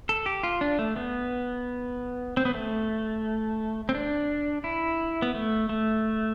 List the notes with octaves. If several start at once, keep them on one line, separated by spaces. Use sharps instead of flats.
A4
G4
F4
D4
A3
B3
C4
B3
A3
C4
D4
E4
B3
A3
A3